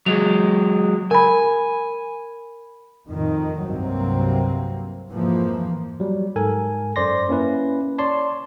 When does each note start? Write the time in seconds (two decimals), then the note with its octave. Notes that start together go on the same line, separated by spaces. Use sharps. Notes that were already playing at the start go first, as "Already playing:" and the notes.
0.06 F#3 G#3 F7
1.11 A#4 G#5 B5
3.08 F2 A2 D#3
3.61 C2 G2 C3 F#3 A#3 C4
5.10 F2 G#2 E3 F3 A#3
6.00 F#3 G3
6.36 G#2 A4 A#4 G#5
6.96 F#2 C5 D5 C6 A#6
7.29 A#3 C#4 E4 B4
7.98 C#5 D5 A5 C6